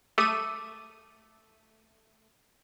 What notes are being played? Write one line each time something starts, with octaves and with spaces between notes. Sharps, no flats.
A3 A4 D6 E6 D#7